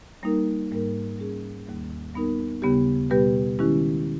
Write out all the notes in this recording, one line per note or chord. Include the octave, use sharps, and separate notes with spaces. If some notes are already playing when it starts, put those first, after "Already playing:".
G3 A#3 D#4 A#4
G#2 G3 A#3 D#4 A#4
G3 C#4 G#4
D#2 D#3 G3 A#3
G3 B3 D#4 A#4
D#2 C#3 G3 B3 G4
B2 G3 B3 G4 B4
D#3 G#3 C#4 E4 G4